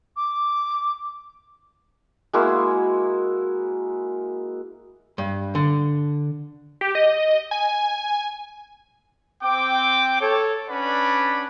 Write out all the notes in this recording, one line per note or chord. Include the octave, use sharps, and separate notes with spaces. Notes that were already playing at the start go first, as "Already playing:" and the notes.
D6
G#3 A#3 E4 F#4
G2
D3
G4
D#5
G#5
C4 G5 D6
A4 C#5
C#4 D4 B4 D5 F#5 B5